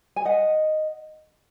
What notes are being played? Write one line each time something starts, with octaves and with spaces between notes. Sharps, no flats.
G#5
D#5 F#5